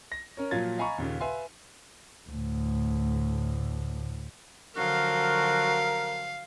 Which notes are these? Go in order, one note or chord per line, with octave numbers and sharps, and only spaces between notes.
A#6
C#4 A#4 C#5
A#2 F3 F#3 F4 G#6 A6
D#5 F5 G#5 A#5 B5 C#6
D#2 A#2 C#3
B4 E5 F5 G#5 C6
D2 A2
D3 F3 F#3 F#4 A#4 F5